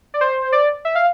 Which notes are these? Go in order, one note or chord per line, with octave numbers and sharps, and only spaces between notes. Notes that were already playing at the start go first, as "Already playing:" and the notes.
D5
C5
D5
E5
F5